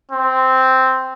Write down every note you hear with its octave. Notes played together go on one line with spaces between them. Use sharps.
C4